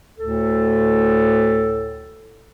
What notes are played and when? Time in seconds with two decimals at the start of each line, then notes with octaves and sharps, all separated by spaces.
0.19 D2 A2 A4